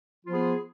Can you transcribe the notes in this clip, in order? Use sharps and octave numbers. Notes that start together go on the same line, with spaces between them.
F3 B3 F4 G#4